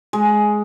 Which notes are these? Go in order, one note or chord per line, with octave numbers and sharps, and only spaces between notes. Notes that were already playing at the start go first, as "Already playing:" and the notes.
G#3